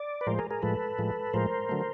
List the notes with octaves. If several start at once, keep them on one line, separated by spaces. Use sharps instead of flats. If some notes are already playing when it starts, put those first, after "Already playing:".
Already playing: D5
B4
A2 F3 G#3 A#4 C5
G#4 A#4
G#4 A#4
A2 F3 G#3 A4 B4
A2 F3 G#3
A2 F3 G#3 A#4 C5
D3 F#3 A3